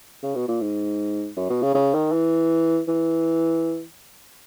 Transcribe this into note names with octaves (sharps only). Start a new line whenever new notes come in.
C#3
B2
A#2
G#2
F#2
B2
C#3
C#3
D#3
E3
E3